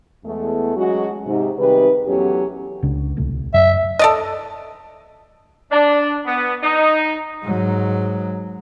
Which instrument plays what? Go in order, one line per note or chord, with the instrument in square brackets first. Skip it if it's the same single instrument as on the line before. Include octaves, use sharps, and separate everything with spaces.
[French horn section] E2 G#3 A3
F#3 G#3 C#4 F#4
G#2 C3
C3 D#3 G3 G#4 B4
E2 A2 F#3 C#4 G4
[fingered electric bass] C#2 C#3 D4
D1 C2 A3
[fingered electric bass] F#2 [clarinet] E5
[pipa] A4 D5 D#5
[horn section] D4
B3
D#4
[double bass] G#2 F#3